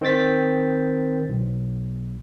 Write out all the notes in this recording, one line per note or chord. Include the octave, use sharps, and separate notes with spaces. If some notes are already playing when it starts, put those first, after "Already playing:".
D#3 C4 G5 A6 B6
B1